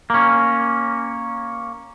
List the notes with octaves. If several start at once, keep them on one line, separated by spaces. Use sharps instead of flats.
A#3 C#4